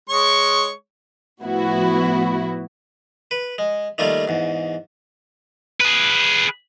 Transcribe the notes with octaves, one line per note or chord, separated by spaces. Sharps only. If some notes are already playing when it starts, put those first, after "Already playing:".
G#3 C#5 C#6
A2 F3 B3 E4 F#4
B4
G#3
D#3 G3 A3 A#3 F4
E2 G#2
G#4 B4